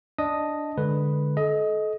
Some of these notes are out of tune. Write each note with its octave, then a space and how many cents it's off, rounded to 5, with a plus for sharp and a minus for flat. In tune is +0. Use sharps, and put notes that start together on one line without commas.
D4 +0 D#5 +0 D#6 +0
D3 +0 G#3 +0 B4 +0
A4 -35 D#5 +15